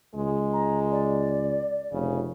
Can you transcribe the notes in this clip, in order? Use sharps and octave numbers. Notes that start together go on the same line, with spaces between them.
C#2 G#3
A#5
D5
F1 C#3